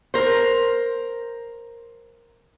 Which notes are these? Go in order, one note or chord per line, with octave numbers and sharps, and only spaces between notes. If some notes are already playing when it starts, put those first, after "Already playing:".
A#4 C5